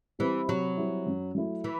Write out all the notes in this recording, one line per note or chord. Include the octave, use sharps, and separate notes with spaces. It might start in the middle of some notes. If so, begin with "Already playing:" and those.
E3 G3 C4 E4
C3 F#3
G3 C4 E4
F#2
F#3 A3 E4
E3